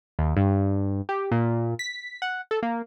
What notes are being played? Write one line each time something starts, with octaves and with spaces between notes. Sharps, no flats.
D#2
G2
G4
A#2
B6
F#5
A4
A#3